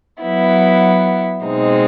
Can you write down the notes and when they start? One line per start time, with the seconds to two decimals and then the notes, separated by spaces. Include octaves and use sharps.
0.21 F#3 B3 E4
1.45 B2 G#3 C4 D#4